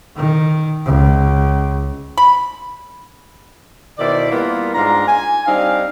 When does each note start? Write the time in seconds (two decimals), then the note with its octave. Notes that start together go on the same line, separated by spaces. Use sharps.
0.16 D#3
0.86 C#2
2.17 B5
3.99 B2 D#3 E4 C5 D5
4.31 G3 A#3 B3 E4 F4 A#4
4.74 G#2 D4 F4 A#5
5.07 G#5
5.46 G3 C4 D4 D#4 F5